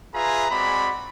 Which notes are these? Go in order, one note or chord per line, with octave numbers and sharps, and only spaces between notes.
F4 G#4 B4 E5 G#5 A#5
G#3 C4 F#4 D5 B5